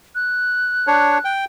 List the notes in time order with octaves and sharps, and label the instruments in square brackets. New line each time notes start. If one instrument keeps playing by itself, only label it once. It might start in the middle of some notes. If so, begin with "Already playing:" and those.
[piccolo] F#6
[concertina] D4 C#5
G5